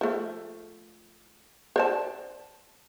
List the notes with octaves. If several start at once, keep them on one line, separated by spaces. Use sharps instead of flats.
F3 A3
C5 D5 A5